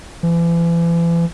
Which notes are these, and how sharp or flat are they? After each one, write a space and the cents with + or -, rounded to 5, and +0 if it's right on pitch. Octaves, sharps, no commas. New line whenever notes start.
E3 +40